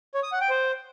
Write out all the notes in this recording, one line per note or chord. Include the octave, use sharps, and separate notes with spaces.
C#5
D#6
F#5
G5
C5